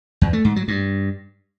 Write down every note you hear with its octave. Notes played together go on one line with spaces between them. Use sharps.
E2
A3
G#2
F#3
G2